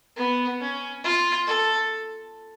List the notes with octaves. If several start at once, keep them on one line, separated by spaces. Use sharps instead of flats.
B3
C#4
F4
A4